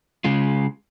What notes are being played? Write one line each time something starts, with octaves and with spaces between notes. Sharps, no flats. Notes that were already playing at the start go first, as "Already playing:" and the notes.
C#3 G#3 F4